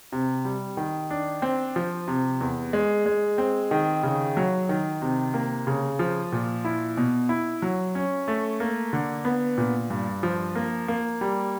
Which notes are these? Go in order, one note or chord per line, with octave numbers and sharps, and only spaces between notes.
C3
G3
D#3
D4
C4
F3
C3
E2
G#3
G#3
C4
D#3
C#3
F#3
D#3
C3
A#3
C#3
F3
A#2
E4
B2
E4
F#3
C#4
A3
A#3
D3
B3
A#2
G2
F3
A#3
A#3
G3